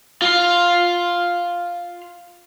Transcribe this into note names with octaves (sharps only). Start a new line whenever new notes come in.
F4 F5